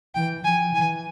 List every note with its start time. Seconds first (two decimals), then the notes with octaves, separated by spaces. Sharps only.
0.15 E3 G5
0.44 F3 G#5
0.74 E3 G#5